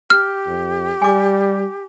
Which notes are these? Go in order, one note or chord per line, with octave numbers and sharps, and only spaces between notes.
G4 F6
F2
G3 G#5 D6